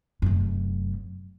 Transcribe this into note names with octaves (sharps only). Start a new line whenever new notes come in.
F1 F#2